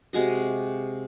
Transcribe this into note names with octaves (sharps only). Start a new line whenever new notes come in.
C3 G#3 F#4 D#5